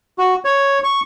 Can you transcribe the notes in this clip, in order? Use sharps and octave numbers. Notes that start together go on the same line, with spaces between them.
F#4
C#5
C#6